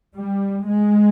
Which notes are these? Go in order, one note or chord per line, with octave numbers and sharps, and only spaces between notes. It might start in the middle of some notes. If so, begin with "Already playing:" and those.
G3
G#3